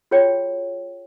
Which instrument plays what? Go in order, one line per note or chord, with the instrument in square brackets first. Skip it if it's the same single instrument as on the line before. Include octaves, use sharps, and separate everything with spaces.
[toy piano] F4 F#4 G#4 C#5 G5